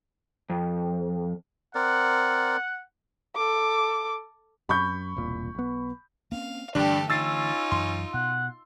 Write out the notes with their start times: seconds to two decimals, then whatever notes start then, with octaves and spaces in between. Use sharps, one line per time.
0.50 F2
1.75 C4 A#4 D5 F#5
3.36 A4 D6
4.69 F#2 B5 C#6 G6
5.16 E1 C2 A#2
5.55 B1 B3
6.32 A#3 C4 C#4 F5
6.75 G2 D3 E3 A3 D4 G4 A4
7.10 C#4 D#4 F4 E6 A6 C7
7.72 F#2 E3 C6
8.14 B2 F#5